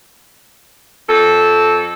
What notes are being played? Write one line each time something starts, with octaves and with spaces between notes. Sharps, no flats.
F2 A4